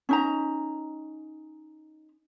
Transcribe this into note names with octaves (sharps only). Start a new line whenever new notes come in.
C#4 D#4 A#5